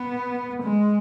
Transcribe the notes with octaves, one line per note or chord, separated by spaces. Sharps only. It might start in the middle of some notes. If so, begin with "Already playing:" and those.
Already playing: B3
G#3